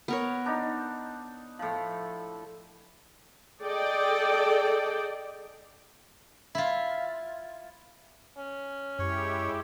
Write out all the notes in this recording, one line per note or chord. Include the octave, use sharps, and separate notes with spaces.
B3 A#4 C#5
D4 D#4
A2 F3
G#4 A4 D5 D#5 G5
E4 F4
C#4
F#2 G#3 E4 G4 C#5